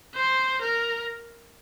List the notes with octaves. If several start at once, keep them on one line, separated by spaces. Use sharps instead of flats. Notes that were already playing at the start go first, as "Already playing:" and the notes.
C5
A#4